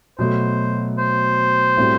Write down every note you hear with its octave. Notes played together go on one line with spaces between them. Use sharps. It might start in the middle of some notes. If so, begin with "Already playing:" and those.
B2 F#3 A3 C5
C5
A2 G3 C4 F#4